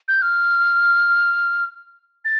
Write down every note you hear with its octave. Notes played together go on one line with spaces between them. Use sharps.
G6
F6
A6